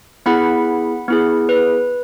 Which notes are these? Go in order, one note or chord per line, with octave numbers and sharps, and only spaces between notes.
B3 E4 G#4 F#5 B5
B3 E4 G#4
B4